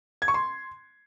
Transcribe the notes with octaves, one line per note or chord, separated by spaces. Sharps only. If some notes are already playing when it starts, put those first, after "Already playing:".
G#6
C#6
C6